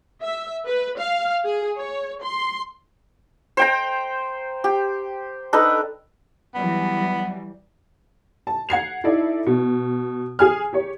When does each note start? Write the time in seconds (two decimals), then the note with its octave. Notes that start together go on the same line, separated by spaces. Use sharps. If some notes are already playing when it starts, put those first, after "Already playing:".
0.22 E5
0.66 B4
0.99 F5
1.44 G#4
1.77 C#5
2.23 C6
3.57 C5 G5 A#5
4.64 G4
5.53 D4 D#4 A4 B4
6.55 E3 F#3 G3 B3
8.47 A5
8.69 F#5 G#6 C7 F7
9.04 D#4 E4 A4 D5 E5
9.46 B2
10.39 G#4 G#5 F6
10.73 G4 C#5